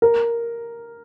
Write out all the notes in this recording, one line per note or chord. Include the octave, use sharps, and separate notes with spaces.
A#4